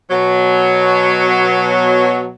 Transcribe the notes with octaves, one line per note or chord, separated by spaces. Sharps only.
B2 F#3